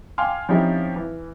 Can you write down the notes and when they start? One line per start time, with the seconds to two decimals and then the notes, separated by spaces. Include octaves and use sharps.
0.18 F5 G5 G#5 C6 D6 F6
0.49 F3 C4 C#4 D#4 E4 G4
0.96 E3